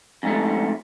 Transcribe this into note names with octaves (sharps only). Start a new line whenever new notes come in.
F2 G#2 A3